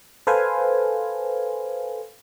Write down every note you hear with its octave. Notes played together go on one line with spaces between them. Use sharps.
A4 B4 C5 F5 G#5